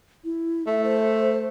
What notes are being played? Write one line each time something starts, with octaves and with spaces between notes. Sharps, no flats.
E4
A3 E5
C5